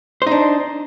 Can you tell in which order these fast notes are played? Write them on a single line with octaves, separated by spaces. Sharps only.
C5 D#4 D4